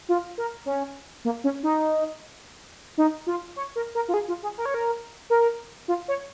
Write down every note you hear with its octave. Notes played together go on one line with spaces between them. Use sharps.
F4
A#4
C#4
A#3
C#4
D#4
D#4
F4
C#5
A#4
A#4
F4
G#4
F4
G#4
A#4
C#5
A#4
A#4
F4
C#5